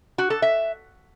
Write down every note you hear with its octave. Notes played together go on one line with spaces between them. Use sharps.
F#4
A4
E5